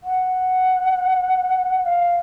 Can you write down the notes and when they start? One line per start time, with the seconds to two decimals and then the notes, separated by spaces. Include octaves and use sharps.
0.04 F#5
1.82 F#5
1.86 F5